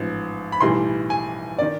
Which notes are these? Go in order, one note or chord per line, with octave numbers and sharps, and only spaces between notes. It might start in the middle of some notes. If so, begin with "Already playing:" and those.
Already playing: A1 G#2 F3
B5
B1 A2 E3 G3 C6
G#5
D#3 D5